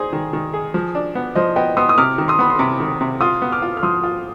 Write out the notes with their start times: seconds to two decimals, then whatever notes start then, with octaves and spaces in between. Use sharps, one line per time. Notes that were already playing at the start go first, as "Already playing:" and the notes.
Already playing: D#4 G#4 C5 D5
0.13 D#3
0.33 D#3
0.54 G#4
0.74 F3
0.95 D4
1.15 B3
1.35 F3 C5 D#5
1.56 B3 D#5 G5
1.77 B3 C6 D#6
1.89 D#6
1.98 C3 D6 F6
2.18 D#3
2.28 C6 D#6
2.39 B3 B5
2.50 C6
2.59 C3 B5 D6
2.80 D#3
3.01 C3
3.21 F4 C6 D#6
3.42 B3
3.52 D6 F6
3.62 F4
3.77 F6
3.83 F3 C6 D#6
4.03 F4